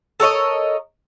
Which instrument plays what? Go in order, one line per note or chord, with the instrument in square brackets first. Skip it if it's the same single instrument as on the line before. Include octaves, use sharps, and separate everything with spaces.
[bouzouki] A4 A#4 C#5 D#5